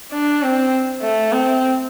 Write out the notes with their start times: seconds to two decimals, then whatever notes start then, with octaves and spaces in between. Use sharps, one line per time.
0.12 D4
0.42 C4
1.02 A3
1.32 C4